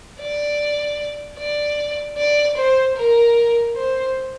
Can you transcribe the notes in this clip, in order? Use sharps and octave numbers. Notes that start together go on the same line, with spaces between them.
D5
D5
D5
C5
A#4
C5